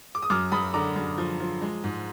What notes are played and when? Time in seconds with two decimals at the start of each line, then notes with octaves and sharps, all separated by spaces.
0.15 D6
0.22 D#6
0.30 F#2 D6 F6
0.52 F#2 B5 D#6
0.74 D3 A#5 D6
0.96 F#2
1.18 F3
1.40 F3
1.62 G#3
1.84 G#2